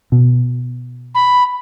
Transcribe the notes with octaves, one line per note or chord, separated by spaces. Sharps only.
B2
B5